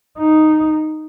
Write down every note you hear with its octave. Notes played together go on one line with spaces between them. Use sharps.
D#4